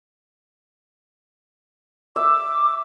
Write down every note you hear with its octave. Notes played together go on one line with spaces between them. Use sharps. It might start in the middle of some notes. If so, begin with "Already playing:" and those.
E5 D6